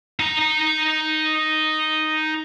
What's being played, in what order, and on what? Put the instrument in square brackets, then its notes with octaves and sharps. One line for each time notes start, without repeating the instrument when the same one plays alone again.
[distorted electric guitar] D#4 A#5